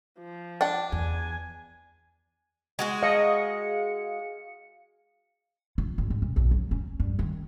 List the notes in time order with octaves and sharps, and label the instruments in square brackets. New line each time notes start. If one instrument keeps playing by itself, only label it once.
[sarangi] F3
[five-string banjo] D4 [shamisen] F#5 G5
[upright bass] E2 [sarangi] G#5
[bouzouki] G#3 F#4 G#4
[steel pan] D#5 [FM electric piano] F5 C#7
[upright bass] F4
G#1
G#2
B1
A#1
F#3
C#4
G2
D#3